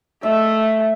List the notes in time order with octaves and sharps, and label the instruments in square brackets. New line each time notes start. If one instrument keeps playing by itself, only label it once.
[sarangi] A3 [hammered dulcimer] E5